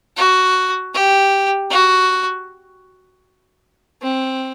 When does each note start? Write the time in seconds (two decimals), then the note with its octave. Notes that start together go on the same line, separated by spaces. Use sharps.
0.17 F#4
0.94 G4
1.70 F#4
4.02 C4